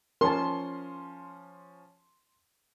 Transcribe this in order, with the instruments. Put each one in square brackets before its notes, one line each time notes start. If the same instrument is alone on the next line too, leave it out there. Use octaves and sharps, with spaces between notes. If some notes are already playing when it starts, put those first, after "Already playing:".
[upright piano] F3 C#4 [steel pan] A#4 A5 [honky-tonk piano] C6